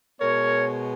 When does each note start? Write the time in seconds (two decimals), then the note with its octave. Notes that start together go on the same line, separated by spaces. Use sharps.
0.20 B2 G#3 B3 A#4 C#5